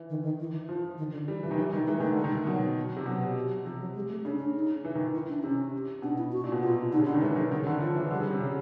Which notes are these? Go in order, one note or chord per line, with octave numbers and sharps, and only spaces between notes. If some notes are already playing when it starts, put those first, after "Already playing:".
Already playing: E3
D#3
D#3
E3
F3
D#3
D3
E3 G3
E3 F3
D#3
E3 F#3
D#3 G3
E3 G#3
D#3 A3
D3
G#3
D#3
G3
B2 F#3
C3
B2 F#3
C3 F3
F#3
G#3
A3
C#3 D4
D4
D#4
E3
D#3
E3
E4
D4
C3 C#4
B2 D4
E4
F#4
A#2
B2
C3 F4
D3 D#4
C#3
D3 D4
D#3
E3 G#3
D#3 F#3
D3 D#3
C#3
D3 D#3
E3 F3
E3 F3
D3 G3
C#3
C3
C#3